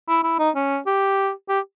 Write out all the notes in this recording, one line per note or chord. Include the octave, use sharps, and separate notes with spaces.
E4
E4
D#4
C#4
G4
G4